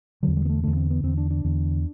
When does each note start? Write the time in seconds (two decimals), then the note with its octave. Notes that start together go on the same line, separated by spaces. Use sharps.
0.23 E2 D3 F#3
0.37 G3
0.45 B3
0.49 A3
0.63 E2 D3 A3
0.76 C4
0.90 B3
1.03 E2 D3 C4
1.18 D4
1.30 D4
1.44 E2 D3